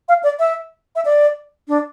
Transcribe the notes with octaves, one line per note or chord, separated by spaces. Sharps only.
F5
D5
E5
E5
D5
D4